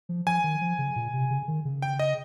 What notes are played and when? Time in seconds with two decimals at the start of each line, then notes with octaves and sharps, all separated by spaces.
0.09 F3
0.27 F3 G#5
0.44 D#3
0.61 F3
0.78 C#3
0.96 A#2
1.13 C3
1.30 C#3
1.48 D#3
1.65 C#3
1.82 G5
1.99 D#5